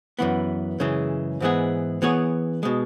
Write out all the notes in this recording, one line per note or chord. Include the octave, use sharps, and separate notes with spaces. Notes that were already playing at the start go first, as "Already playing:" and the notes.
F#2 E3 B3
F#2 C#3 E3 G#3
G#2 E3 G#3 B3 G#4
E3 B3 G#4 C#5
B2 G#3